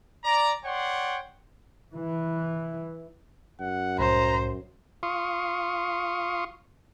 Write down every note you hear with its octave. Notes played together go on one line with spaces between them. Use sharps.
D5 A#5
C#5 D5 F#5 G5 C6
E3
F#2 F#5
C2 A2 F#3 C5 A#5
F4 F5 C6 C#6 D#6